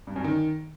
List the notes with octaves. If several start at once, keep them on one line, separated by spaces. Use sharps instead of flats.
G2
F#2
D#3